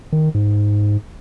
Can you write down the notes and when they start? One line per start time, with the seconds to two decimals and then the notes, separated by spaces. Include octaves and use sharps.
0.12 D#3
0.34 G#2